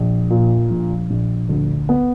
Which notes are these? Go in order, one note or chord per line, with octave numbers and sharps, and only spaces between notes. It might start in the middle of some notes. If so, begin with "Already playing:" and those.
Already playing: A#1
A#2
A#1
A#1
D2
B3